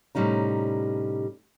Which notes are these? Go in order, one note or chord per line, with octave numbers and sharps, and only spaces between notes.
A2 C3 G3 C#4 D#4 A#5